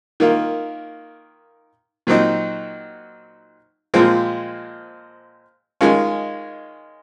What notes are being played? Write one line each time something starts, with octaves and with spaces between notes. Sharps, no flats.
D#3 A#3 F4
A#2 F#3 C4 D#4
A#2 F3 G#3 C4 F4
D#3 G#3 C#4 F4